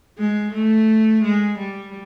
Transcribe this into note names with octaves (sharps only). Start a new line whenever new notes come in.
G#3
A3
G#3
G3